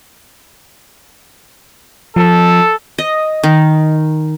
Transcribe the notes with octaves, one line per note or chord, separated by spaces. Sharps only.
F3 A4
D#5
D#3